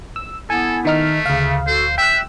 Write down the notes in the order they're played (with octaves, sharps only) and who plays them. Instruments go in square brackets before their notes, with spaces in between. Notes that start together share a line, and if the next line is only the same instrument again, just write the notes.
[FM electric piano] E6
[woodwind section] B3 E4 [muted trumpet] A4 [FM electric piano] G#5
[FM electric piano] D#3 D#4 F6 [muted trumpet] A3
[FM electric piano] D2 F5 [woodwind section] C#3
[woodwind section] F#4 A4 [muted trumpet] C5
[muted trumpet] E5 [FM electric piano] G5 F#6 [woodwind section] E6